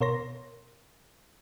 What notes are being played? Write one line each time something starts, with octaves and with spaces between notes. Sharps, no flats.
B2 A#4 C#5 C6 A#6